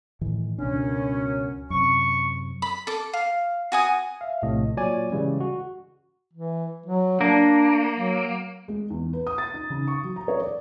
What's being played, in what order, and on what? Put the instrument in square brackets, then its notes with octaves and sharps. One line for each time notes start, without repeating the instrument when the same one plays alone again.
[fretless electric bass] A2 D#3 E3
[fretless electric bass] C#2 B2 D4 [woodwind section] F#2 C#4
[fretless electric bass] F#2 C3 [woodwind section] C#6
[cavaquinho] B5
A4 D6
F5
F#4 G#5 D#6
[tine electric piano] E5 F5
A#1 A2 C3 D#5
A#2 F#3 C#5 D5 G#5
C#3 E3 G3 G#3 C#4
F#4
[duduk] E3
F#3
[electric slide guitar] A#3 [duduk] D4
[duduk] F#3
[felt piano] G#3
E2
B4
D#6
A6
D#4
C#3
C#6
F#3
A#5
C#5
D5